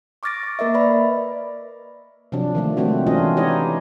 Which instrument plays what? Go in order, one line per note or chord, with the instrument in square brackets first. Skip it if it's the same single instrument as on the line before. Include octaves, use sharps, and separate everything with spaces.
[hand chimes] C#6 D6 F6 A6 A#6 D7
C#6
A#3 A#4 D#5 E5
B4 D5 E5 B5
[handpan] C3 F3 F#3 D4
D#3 F3 A3
F3 F#3 G#3 A3 C4 F#4
E3 C#4 D4 F4 F#4 D#5
D#4 E4 G4 C#5 D#5